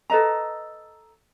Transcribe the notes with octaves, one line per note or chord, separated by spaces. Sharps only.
A4 B4 D#5 A#5